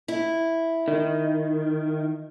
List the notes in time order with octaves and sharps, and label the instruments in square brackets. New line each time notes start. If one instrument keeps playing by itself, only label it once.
[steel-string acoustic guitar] E4
[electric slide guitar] D#3